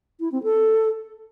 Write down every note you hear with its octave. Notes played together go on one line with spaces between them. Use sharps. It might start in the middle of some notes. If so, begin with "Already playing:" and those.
E4
C4
A4